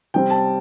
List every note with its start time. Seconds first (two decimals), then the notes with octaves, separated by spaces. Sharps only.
0.14 C3 G3 C4 G5
0.30 A5